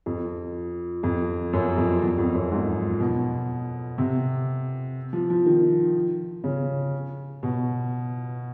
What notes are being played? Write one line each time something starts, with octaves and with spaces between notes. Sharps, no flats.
F2
F2
F#2
F2
E2
F2
F#2
G#2
B2
C3
F3
F3
D#3
C#3
B2